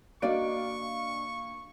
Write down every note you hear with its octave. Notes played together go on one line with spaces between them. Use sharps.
A#3 D4 F#4 D5 D#5 F5 C#6 D7